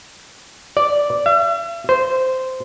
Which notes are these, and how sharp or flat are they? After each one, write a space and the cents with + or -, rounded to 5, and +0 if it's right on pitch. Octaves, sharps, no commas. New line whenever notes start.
D5 -5
E5 +45
C5 -10